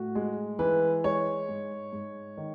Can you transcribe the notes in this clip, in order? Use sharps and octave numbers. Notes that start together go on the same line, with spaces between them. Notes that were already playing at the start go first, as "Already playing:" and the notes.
Already playing: A2 F#4
G#3
E3 B4
G#3 C#5
G#2
G#2
D#3